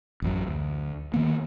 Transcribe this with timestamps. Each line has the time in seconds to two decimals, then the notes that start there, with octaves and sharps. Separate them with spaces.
0.22 A1 F#2 F#3
0.48 D2
1.14 D#3 A#3 B3